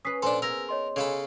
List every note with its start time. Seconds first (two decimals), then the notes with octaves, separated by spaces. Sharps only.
0.05 C#4 B4 D#6 B6 C7
0.23 A#2 F3 D4 A4 C5 G#5 C6
0.42 B3 G#4 A#4 C5 E6 A#6
0.69 C#5 D#5 C6
0.96 C#3 A4 F#5 G#5 B5